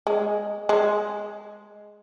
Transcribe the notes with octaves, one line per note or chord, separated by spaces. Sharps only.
G#3
G#3